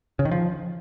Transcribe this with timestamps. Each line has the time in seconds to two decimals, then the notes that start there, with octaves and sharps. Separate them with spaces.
0.19 C#3
0.25 D#3
0.31 F3